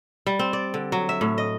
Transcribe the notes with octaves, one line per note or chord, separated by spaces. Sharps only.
G3
C4
D5
D3
F#3
E5
A2
D#5